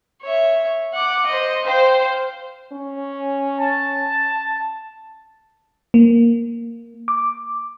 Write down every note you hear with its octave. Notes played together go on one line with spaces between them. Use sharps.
C#5 E5
F#5 D6
C5 D#5
C5 F5 G5
C#4
A5
A#3
D6